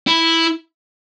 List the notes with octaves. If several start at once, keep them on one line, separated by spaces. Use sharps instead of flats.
E4